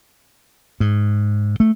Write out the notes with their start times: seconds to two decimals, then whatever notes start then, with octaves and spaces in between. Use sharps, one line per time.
0.80 G#2
1.60 A3